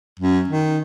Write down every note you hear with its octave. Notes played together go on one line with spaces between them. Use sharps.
F#2
D#3